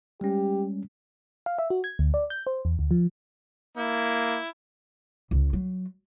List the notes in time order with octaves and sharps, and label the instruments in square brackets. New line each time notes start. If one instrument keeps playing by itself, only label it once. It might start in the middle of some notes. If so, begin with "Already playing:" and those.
[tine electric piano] G3 G#3 C#4 [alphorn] G4
[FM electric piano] F5
E5
F#4
G#6
D2
D5
G6
C5
E2
D2
F3
[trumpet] A#3 [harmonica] E4
[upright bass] C#2 C#3
F#3